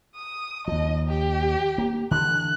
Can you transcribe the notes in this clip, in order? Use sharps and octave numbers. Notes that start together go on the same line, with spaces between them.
D#6
D#2 F3 D#5
G4
A#3
D3 E3 F#6